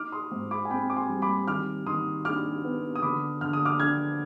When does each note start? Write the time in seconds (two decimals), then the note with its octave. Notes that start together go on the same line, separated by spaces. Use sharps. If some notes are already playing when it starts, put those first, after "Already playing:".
Already playing: D#4 D6 F6
0.12 C6 D#6
0.32 G#2
0.51 B5 D6
0.65 G#5
0.70 C4 G5 B5
0.90 D6
0.96 G#5 C6
1.09 G3
1.22 B5 D6
1.48 D#3 D6 F6
1.87 D#3 C6 D#6
2.25 D4 D6 F6
2.64 B3
2.96 D#6
3.02 D3 B5 D6
3.41 D3 F6
3.53 D#6
3.65 D6 F6
3.80 D4 F6 G#6